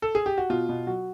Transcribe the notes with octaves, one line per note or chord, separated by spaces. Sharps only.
A4
G#4
G4
F#4
B2 F4
B2
F#3 F#4